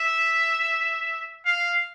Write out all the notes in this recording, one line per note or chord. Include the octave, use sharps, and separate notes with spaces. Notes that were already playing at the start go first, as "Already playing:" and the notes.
Already playing: E5
F5